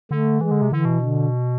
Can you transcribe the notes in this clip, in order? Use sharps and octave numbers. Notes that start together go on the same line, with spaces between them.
D3 A3
E3 G#3
D3
C3
D3 E3
B2
D3